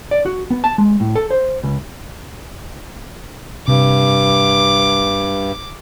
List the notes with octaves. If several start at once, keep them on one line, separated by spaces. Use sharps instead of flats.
D5
F#4
B3
A5
G#3
A2
A4
C5
C#2
G2 C3 D6